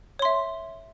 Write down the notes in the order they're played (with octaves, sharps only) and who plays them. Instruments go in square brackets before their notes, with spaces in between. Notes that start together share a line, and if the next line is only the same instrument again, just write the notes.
[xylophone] C#5
C6
E5